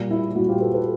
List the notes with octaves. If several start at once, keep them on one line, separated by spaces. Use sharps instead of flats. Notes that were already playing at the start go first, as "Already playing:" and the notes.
Already playing: A#2 G3
E4
A#2 G3 E4 F#4
F4 G4
A4 B4
A4 B4